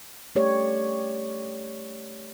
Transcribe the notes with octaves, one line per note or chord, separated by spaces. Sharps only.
A3 G4 C#5 D5